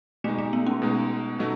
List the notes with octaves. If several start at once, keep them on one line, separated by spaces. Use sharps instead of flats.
B2 G#3 A3 D#4
A3
B3
C#4
B2 G#3 D#4
B2 F#3 A3 D#4